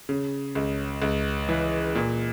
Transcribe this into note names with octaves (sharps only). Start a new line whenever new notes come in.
C#3
C#2
C#2
E3
A#2